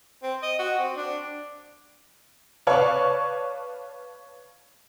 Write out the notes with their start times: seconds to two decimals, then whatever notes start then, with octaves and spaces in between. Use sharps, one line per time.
0.23 C4
0.42 D#5
0.59 F#4
0.79 C4
0.96 D4
2.67 B4 C#5 D5 F5 A5 C#6